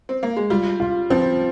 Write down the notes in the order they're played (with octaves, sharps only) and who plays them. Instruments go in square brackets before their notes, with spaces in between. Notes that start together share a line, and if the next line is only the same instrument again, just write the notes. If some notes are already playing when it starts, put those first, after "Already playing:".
[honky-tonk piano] C4
A#3
G#3
[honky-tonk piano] G3 [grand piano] F4
[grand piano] F4
[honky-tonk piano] F3 [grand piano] C4